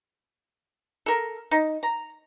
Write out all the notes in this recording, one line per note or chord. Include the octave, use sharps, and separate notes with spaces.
A4 A#4
D#4
A#5